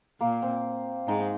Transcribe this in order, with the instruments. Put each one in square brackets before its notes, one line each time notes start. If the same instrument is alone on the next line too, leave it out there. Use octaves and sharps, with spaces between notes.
[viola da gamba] A#2 [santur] A#3
[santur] C4
[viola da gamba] G#2 [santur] D#4
[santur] D#4